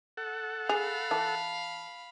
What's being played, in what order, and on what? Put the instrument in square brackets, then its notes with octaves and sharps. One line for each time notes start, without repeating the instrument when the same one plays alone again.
[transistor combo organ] A4 F#5
[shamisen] G#4 [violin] F5 B5 [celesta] F7
[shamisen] E3 [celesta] A5